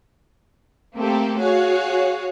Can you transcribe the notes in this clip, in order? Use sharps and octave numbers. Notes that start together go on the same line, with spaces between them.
A3 A#3 C4 G4 A4
F#4 G#4 C#5 F5